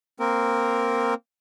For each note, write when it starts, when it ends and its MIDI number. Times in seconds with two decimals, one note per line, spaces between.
0.20 1.14 58
0.20 1.14 60
0.20 1.14 70